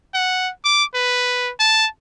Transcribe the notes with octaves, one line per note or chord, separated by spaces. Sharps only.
F#5
D6
B4
A5